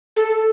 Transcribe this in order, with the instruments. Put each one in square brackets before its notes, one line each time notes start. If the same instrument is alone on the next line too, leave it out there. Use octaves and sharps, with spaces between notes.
[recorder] A4